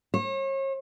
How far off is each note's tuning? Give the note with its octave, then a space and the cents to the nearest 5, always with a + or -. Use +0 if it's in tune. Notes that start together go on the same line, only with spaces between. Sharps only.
C#5 -40